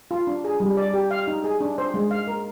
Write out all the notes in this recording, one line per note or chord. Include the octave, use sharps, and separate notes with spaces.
F4
D4
G#4
G3
D5
G4
F5
D#4
G#4
D4
C5
G#3
F5
A#4